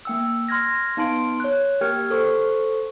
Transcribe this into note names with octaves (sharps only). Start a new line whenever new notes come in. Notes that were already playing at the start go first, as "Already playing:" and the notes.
A#3 G5 E6
C6 F6 G#6 A#6
B3 D#4 A5 C6 D7
C#5 F#6
A#3 G4 A#4 G5 F6 G#6
A4 C5 C#6